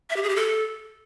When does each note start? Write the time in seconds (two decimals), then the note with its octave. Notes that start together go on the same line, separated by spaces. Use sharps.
0.10 E5
0.16 G4
0.23 G#4
0.29 G4
0.36 A4